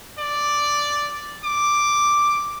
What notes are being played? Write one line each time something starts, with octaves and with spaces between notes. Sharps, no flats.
D5
D6